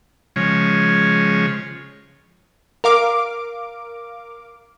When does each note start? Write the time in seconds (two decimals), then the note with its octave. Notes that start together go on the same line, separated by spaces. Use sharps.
0.36 C#3 F3 G#3 C#5
2.84 A#4 F5 D6